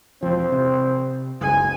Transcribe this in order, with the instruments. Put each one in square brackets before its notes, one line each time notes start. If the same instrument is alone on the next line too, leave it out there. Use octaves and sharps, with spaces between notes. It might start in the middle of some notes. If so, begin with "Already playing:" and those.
[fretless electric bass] E1 F3 [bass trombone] C4
[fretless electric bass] C3
[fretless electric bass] F#1 C#2 [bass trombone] G#2 [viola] G#5